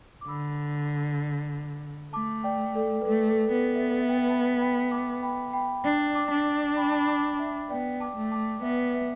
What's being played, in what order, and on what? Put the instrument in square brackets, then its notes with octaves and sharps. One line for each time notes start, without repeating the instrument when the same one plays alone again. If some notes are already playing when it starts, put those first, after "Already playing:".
[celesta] D6
[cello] D3 [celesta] B5 E6
[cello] A3 [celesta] A5 D6
[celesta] D5 G5
A4 D5
B4
[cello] A3 [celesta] A4
[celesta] A4
[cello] B3 [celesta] B4
[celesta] B4 E5
E5
G5
B4 E5
B5
E5 A5
G5 B5
A5 D6
G5 B5
G5 B5
[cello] D4 [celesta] D5 G5
[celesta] A5 D6
[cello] D4
[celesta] G5 B5
A5
B5
A5 D6
E5 A5
[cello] B3 [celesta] D5 G5
[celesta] A5 D6
[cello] A3
[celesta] A5 D6
[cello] B3 [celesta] B4 E5
[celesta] B4 E5